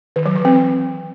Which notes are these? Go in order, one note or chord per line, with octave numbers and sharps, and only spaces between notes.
D#3
F#3
E3
C4